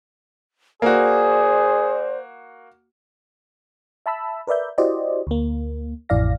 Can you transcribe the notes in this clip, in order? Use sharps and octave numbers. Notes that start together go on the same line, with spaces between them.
A#3 F#4 G#4 C5 D5
E5 A5 B5 E6
A#4 B4 D5 E5 G6
E4 F#4 G4 C5 D5 D#5
D2 A#3
A1 F2 E4 D5 F5 A#6